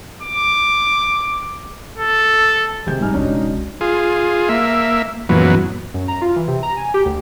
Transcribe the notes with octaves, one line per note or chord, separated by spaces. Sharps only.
D6
A4
C3 D#3 G#3 G6
A2 G3 D4 D#4 G#5 F6
E1 C#2 C#4 D4 F#4
F4 G#4
A#3 E5
F#2 A#2 E3 F#3 B3
F#2
A#5
F4
E3
C3
A#5
G#5
G4
D2